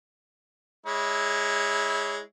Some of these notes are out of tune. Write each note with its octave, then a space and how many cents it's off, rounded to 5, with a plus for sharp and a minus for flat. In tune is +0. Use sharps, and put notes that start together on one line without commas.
G#3 -5 E4 -20 C#5 +10